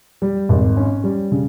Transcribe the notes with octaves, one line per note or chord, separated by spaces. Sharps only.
G3
G#1
C#4
G3
C#3